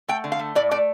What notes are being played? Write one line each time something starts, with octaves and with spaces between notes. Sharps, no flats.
A3 G5
D3
F5
A3
A2 D5
A3 D5